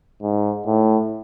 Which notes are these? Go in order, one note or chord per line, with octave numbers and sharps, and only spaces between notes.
G#2
A2